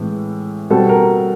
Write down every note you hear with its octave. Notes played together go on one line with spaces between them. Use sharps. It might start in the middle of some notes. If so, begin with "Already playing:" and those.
Already playing: A2 E3 G#3 C4
B2 G3 C4 A4
A#4